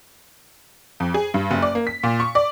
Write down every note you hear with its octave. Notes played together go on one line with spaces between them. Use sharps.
F2
G#4
G2
F#1
D5
A#3
B6
A#2
C#6
D5